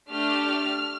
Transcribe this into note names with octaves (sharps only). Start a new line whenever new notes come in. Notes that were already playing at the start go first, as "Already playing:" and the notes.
A3 D4 G4 F6